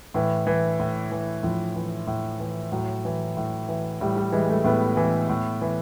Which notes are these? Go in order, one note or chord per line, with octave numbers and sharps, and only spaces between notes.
A2 E3
E3
A2
E3
A2 F3
E3
A2
E3
A2 F#3
E3
A2
E3
A2 G3
G3
E3 G#3
A3
A2 B3
E3
A2
E3